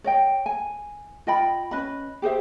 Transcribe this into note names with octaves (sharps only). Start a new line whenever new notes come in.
C#5 D#5 G5
G#5
F4 D#5 G5 B5
C#4 B4 D#5 B5
G4 G#4 C5 E5